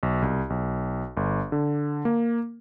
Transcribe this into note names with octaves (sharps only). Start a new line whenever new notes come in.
B1
C2
B1
G1
D3
A#3